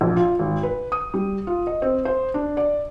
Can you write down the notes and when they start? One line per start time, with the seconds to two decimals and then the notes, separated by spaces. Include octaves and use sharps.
0.01 A#1
0.16 F4
0.39 G#1
0.63 B4
0.92 D#6
1.14 G3
1.47 F4
1.67 D#5
1.82 C4
2.05 C5
2.34 D4
2.57 D5